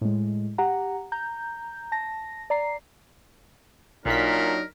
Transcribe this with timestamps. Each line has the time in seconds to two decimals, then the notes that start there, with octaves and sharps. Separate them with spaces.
0.01 A2 G#3
0.58 G4 F#5 A#5
1.12 A#5 G6
1.92 A5 A#6
2.50 D5 A#5 C7
4.06 B1 A#2 F#3 D4 D#4 A#4 B6